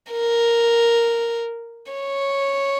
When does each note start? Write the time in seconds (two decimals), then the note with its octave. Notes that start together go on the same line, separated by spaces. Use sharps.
0.11 A#4
1.92 C#5